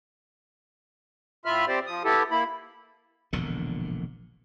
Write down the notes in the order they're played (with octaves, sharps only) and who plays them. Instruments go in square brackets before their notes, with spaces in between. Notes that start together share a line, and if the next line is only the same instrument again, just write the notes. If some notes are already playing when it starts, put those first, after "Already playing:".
[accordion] A2 F4 E5 B5 F6
C4 G4 C5 D5
F3 D#6
B3 E4 G4 A4
A#3 E4 B5
[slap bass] E1 A#1 A#2 D3